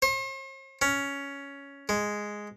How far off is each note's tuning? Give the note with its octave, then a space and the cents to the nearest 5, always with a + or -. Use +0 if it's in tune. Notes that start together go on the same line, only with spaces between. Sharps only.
C5 +45
C#4 +10
G#3 +0